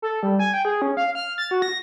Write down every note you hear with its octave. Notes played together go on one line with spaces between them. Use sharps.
A4
G3
G#5
G5
G#4
C#4
F5
F6
A6
F#4
A#6